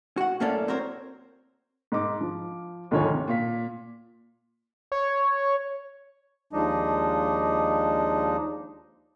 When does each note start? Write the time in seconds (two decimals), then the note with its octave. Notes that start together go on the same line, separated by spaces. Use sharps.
0.17 F#4 F#5
0.40 F#2 A2 A#3 C#4 A4 D5
0.68 C4 F#4 A#4 C5 C#5
1.92 G#2 D#4 D6
2.21 F3
2.91 D2 G#2 D#3 F3 C#5 G#5
3.14 C3
3.28 A#2 F5 B6
4.92 C#5
6.53 D#2 F3 G#3 D4 D#4 D#5